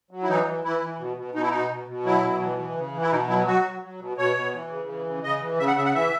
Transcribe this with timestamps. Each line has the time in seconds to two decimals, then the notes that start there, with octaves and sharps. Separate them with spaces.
0.11 F#3
0.23 E4
0.29 E3 D#4
0.46 E3
0.64 E3 E4
0.82 E3
0.99 B2
1.17 B2
1.35 B2 D#4
1.42 E4
1.50 B2 D#4
1.70 B2
1.88 B2
2.05 F#3 E4
2.24 B2
2.41 E3
2.59 E3
2.76 C#3
2.94 E3
3.02 E4
3.12 B2 D#4
3.29 F#3 E4
3.47 F#3 F#4
3.64 F#3
3.82 F#3
4.00 B2
4.17 B2 C#5
4.36 B2
4.53 E3
4.71 C#3
4.88 E3
5.06 C#3
5.23 C#3 D#5
5.42 E3
5.59 C#3 E5
5.68 F#5
5.77 C#3 E5
5.85 F#5
5.94 E3 E5